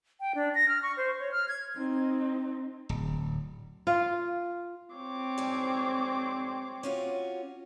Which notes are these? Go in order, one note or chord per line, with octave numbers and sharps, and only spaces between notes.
G5
D4
A#6
F6
C#6
C5
C#5
F6
G#6
C4 D#4
D1
F4
C4 C#5 D6
F2 G#2 G3
C#4 F4 F#4